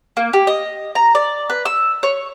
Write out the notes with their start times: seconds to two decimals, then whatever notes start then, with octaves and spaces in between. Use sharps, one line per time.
0.17 A#3
0.33 G4
0.47 D#5
0.95 A#5
1.15 D5
1.50 B4
1.65 E6
2.03 C#5